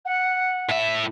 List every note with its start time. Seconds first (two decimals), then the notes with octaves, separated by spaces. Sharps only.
0.05 F#5
0.69 A2 E5